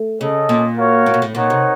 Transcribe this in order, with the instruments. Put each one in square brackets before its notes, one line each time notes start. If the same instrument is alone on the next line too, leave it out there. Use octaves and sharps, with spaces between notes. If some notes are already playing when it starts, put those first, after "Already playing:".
Already playing: [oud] A3
[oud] C#3 [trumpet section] C#4 A4 D#5
[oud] A#2
[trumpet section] F#4 A#4 C#5 F5
[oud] A2
A#2
A2
[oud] A#2 [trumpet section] D#4 A#4 C#5 F#5
[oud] C3